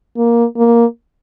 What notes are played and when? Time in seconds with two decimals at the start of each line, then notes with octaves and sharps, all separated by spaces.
0.17 A#3
0.57 A#3